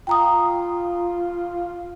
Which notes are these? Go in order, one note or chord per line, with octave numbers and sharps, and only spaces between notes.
F4 G5 A#5 D#6